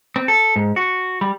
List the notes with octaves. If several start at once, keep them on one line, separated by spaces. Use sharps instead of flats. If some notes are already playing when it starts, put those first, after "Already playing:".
C4
A4
G#2
F#4
G3